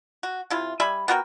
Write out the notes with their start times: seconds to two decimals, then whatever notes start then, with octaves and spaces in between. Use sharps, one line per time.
0.23 F#4
0.50 C3 E4 F4
0.80 G3 E5 G#5 B5
1.08 B3 F#4 A#4 G5